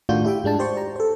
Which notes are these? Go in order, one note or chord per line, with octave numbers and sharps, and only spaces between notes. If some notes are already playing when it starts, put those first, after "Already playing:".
A2 D#3 D4 F4 F#4 G6
E4 G4 E5 G5
G#2 G#3 D4 A5
G4 C5 D5 C#6
A#5
A4 C5